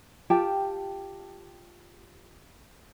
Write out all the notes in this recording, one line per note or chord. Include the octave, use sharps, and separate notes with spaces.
F4 G4 G5 A5